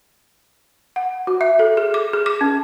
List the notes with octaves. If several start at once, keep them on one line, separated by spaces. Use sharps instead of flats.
F#5
F#4
E5
A4
G#4
D6
G#4
D6
C#4